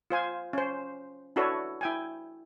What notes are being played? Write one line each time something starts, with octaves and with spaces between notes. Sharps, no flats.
F4 C5 G#5
C#4 C5
D4 E4 F#4 A4 B4 C#5
E4 G5 G#5